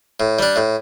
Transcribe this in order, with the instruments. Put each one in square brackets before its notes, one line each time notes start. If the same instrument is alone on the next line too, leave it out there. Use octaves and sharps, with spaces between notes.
[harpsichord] A2
G3 D4
A2